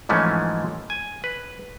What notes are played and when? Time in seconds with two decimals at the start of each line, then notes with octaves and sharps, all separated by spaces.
0.09 G#2 E3 F3 A3 C#4
0.90 G#5
1.24 B4